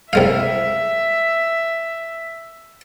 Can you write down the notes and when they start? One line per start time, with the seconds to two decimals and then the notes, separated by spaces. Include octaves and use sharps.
0.13 C2 G#3 E5 F5